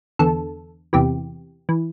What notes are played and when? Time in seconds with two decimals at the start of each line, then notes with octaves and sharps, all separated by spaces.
0.19 E2 D3 A4
0.93 E2 C3 E3 G4
1.69 E3